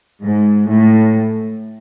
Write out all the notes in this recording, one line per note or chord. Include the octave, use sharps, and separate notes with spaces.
G#2
A2